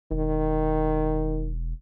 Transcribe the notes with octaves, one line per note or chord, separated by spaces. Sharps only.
E1 D#3